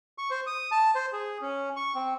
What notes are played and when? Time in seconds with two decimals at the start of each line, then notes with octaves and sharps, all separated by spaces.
0.18 C#6
0.31 C5
0.47 D#6
0.71 A5
0.95 C5
1.13 G#4
1.41 C#4
1.76 C#6
1.95 C4